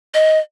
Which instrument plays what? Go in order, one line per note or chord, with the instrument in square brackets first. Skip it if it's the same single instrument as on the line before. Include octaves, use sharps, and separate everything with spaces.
[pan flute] D#5